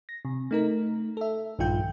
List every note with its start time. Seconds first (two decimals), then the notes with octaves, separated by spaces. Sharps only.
0.09 A#6
0.25 C3
0.51 A3 D#4 A#4
1.17 A4 E5
1.59 A#1 G2 D#3 F4 G5 G6